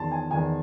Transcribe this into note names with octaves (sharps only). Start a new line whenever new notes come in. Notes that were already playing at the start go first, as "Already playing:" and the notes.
Already playing: E2 D#3 A5 C6
G#5
E2 D#3 G#5